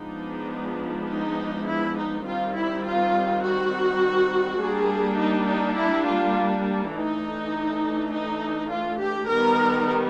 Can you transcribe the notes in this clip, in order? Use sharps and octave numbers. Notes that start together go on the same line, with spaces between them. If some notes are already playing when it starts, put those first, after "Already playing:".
Already playing: F3 G#3 B3 D4 D#4
D#4
E4
D#4
D#3 G3 C4 F4
E4
F4
F#4
G3 A#3 D4 G#4
D#4
D#4
E4
F4
E3 A3 D4 D#4
D#4
F4
G4
D#3 G3 B3 A#4